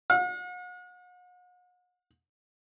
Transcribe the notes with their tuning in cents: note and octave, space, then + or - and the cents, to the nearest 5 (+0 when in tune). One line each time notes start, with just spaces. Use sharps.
F#5 -40